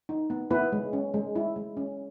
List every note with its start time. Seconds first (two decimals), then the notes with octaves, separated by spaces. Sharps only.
0.09 D#4
0.30 B3
0.51 B3 E4 B4
0.72 G#3
0.93 C#4
1.14 G#3
1.36 E4
1.56 G#3
1.77 C#4